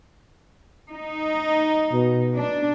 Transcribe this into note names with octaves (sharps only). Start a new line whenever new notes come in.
D#4
B2
D4